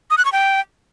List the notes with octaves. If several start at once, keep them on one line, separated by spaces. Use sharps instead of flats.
D#6
F#6
C#6
G5